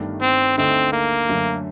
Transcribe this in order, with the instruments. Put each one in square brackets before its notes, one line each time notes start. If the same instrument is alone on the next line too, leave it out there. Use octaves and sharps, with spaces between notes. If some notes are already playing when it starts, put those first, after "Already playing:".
Already playing: [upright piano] G1 G2 D#3 A3 D4
[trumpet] C4
[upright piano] D2 D3 A3 D#4 [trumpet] C4
[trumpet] A#3
[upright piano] F#2 D3 F#3 A3